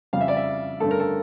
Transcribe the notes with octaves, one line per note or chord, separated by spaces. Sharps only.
F2 C#3 G3 F5
E5
D5
E5
G2 D3 A3 C#4 A4
A#4
A4